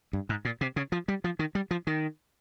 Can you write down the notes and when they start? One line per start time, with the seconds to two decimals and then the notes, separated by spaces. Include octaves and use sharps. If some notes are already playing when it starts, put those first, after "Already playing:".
0.13 G2
0.29 G#2
0.45 A#2
0.61 C3
0.76 C#3
0.92 F3
1.08 G3
1.24 F3
1.39 D#3
1.55 G3
1.71 F3
1.87 D#3